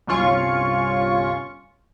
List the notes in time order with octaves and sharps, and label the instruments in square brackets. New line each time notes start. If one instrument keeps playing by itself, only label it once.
[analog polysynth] G1 C2 C#4 F4 C#6